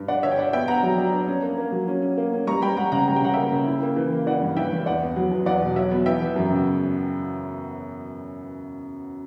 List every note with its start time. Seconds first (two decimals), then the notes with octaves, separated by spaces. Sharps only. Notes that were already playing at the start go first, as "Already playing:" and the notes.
Already playing: G2
0.08 D4 D5 F#5
0.23 D3 C#5 E5
0.32 G5
0.38 D4 D5 F#5
0.53 B3 E5 G5
0.68 B3 F#5 A#5
0.83 F#3
0.98 D4
1.13 D4
1.28 C#4
1.43 A#3
1.57 A#3
1.72 F#3
1.88 C#4
2.02 C#4
2.18 A#3
2.33 C#4
2.47 G3 A#5 C#6
2.62 G3 G5 B5
2.77 G3 F#5 A#5
2.92 C#3 F#5 A#5
3.07 G3 A#5
3.16 G5
3.22 C#3 F#5
3.33 A#3 E5 G5
3.52 C#3
3.67 E4
3.82 A#3
3.96 E3
4.12 A#3
4.27 E3 D5 F#5
4.42 G2
4.57 E3 E5 G5
4.72 G2
4.86 E2 D5 F#5
5.02 B3
5.16 F#3
5.31 E2
5.46 E2 D5 F#5
5.62 B2
5.76 F#3 C#5 E5
5.91 B3
6.06 E3 E5 G5
6.21 E3
6.36 F#2
6.51 C#3